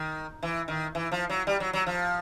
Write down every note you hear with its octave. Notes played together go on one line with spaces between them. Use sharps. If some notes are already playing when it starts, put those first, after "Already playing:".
Already playing: D#3
E3
D#3
E3
F3
F#3
G3
F#3
F#3
F3